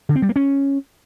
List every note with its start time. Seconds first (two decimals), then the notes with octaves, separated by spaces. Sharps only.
0.09 D3
0.16 C4
0.22 G3
0.29 A#3
0.36 C#4